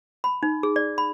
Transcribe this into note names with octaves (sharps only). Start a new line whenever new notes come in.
B5
D#4
G#4
D5
B5